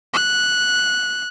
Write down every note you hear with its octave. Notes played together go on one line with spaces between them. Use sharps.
F#6